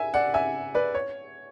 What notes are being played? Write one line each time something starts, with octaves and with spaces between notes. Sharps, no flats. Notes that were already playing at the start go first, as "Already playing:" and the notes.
Already playing: E5 G#5
D5 F#5
E5 G#5
B4 D5
C#5